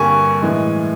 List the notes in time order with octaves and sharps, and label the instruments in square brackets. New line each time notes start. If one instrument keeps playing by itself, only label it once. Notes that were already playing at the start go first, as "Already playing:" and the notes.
Already playing: [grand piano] G2 D3 G3 A#3 G#5 C#6
A2 E3 G#3